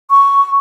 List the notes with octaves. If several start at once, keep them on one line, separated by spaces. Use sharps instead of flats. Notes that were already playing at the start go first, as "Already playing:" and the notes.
C#6